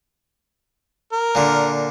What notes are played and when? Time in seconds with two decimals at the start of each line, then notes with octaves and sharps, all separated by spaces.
1.12 A#4
1.35 A#2 D3